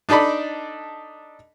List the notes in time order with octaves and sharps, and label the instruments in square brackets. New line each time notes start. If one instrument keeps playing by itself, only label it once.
[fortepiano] D4 D#4 A4 D5 B5